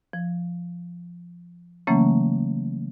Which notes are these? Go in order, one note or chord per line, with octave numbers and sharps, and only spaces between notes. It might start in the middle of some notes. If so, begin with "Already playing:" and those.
F3
C#3 E3 F#3 A3 A#3 C#4